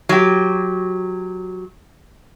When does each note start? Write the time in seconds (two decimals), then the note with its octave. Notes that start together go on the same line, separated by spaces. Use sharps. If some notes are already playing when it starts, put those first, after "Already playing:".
0.09 F#3 G4